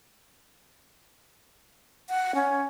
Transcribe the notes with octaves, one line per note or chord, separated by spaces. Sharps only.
F#5
C#4